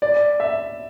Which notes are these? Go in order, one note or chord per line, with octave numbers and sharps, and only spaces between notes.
D5
E5